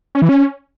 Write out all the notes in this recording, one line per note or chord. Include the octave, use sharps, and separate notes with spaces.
C#4
E3
C#4